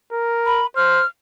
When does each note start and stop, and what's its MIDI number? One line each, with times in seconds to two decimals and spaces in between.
0.12 0.64 70
0.46 0.67 83
0.76 1.03 72
0.76 1.06 89